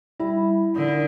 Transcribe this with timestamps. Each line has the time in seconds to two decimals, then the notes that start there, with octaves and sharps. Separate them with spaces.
0.20 G3 E4 E5 B5
0.76 D3 D#4 A#4